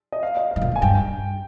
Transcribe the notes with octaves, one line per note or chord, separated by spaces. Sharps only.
D#5
F5
D#5
G#2 F5
A#2
F2
G#5
G2 G5